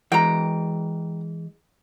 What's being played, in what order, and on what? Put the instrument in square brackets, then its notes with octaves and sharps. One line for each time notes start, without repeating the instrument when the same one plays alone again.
[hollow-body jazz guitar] E3 G#3 [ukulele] G5 A#5